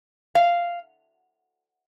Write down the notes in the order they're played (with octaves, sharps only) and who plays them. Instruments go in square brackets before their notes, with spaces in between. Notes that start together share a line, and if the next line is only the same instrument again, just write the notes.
[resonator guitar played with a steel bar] F5